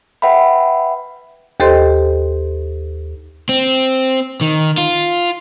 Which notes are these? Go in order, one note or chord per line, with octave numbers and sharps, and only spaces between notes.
B4 E5 F#5 G5 B5
D#2 G4 A4 C5 D#5 C6
C4
D#3
F4